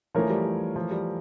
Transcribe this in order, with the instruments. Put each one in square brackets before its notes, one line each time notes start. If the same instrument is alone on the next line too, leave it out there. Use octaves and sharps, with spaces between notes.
[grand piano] E3 A3 E4 A#4 C#5 [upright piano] F3
[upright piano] G3
G3
F3
G3